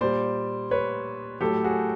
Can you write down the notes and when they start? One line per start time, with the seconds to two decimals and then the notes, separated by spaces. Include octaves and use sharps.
0.01 A#2 G3 C5 D5
0.71 B4 C#5
1.40 A2 F#3 G4 A4
1.64 F#4 G#4